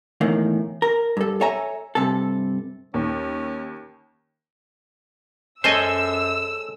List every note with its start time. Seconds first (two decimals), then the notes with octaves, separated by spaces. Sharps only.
0.21 E2 A2 D#3 A#3
0.82 A#4
1.17 G2 A4
1.41 A4 C#5 E5 G#5 A#5
1.95 G2 C3 A4
2.94 D#2 C#4
5.64 F#2 G#3 C#4 A4 C5 D#5 G#5 E6